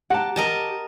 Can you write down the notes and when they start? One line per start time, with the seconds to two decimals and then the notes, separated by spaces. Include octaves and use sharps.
0.10 G4 F#5 A5 A#5
0.36 G4 A#4 D#5 A5